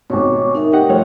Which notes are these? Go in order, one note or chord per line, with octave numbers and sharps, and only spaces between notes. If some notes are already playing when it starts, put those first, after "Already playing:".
G#1 B2 C#5 C#6 D6
D#4 A#4 E5
G4 D#5 F#5 G5
F3 A3 C#5